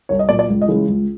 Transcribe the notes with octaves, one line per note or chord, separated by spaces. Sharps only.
C2 C#5
D#5
A#2 F#3 D5
D5
C#2
D#5
C#3 E3 G#3
C#2